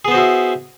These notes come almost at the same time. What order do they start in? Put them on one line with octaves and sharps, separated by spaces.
G#4 B3 C5 F#4 E4